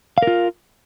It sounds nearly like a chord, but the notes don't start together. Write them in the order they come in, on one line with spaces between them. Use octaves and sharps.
F5 A#4 F4